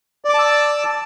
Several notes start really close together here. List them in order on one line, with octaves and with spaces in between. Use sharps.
D5 D6 A5 E6